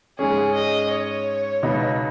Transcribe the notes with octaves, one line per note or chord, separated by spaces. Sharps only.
G#2 G#3 C#4 G#4
D#5
C#5
C#2 B2 B3 D#4